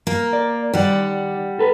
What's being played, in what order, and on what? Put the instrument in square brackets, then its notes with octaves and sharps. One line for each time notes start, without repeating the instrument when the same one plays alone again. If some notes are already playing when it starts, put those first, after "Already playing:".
[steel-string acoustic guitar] A#3 A#4
[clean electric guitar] D5
[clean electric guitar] D#3 D5 [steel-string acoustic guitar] G3 F#5
[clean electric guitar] A4 B4